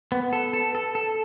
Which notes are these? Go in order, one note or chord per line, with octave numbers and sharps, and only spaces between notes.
B3
A4
A4
A4
A4